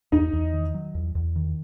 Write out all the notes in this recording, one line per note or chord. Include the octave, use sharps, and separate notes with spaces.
E2 D#4 D#5
E2
D#3
F#3
E2
E2
D#3